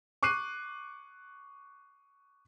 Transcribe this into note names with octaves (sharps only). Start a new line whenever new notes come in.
C#6 D6 F#6 C7 D#7